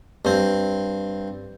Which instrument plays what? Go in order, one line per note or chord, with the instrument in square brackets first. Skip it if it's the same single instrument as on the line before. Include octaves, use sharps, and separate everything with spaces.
[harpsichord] G2 C4